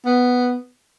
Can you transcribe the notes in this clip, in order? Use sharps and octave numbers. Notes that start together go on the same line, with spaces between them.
B3